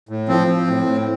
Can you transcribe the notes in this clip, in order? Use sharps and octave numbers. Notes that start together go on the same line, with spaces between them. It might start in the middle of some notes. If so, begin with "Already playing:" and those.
A2
F3 C4
F3
A2
A2